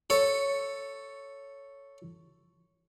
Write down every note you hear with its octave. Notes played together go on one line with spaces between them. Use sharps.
A4 C#5